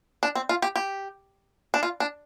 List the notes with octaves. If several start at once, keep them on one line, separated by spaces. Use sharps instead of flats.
D4
C4
F4
G4
G4
D4
F4
D4